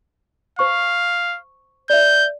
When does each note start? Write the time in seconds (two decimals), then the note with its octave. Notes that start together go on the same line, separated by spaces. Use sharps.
0.59 C5 F5 C#6
1.90 D5 E5 G6